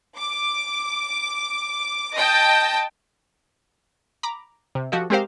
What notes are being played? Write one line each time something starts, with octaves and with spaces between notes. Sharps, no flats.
D6
D#5 G5 A5
A#5 B5 D6
C3
F3 F#4 G4 A4 D#5
G#3 C4 G4 A#4 C5 F5